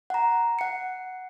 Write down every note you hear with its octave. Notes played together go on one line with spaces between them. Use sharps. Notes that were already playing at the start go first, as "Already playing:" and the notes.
F#5 A#5
F#5 C#7